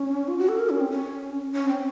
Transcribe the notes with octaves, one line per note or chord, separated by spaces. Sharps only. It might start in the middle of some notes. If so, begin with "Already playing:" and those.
Already playing: C#4
F4
F#4
A4
A#4
C#4
C4
C#4
C#4
C4